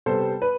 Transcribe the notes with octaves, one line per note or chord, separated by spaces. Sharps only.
C3 G3 B3 A4 C5
B4